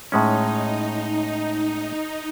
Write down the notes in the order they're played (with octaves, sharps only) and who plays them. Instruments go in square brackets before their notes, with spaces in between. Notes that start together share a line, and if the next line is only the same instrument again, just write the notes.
[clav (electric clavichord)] A2 G#3 C#4 [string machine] D#4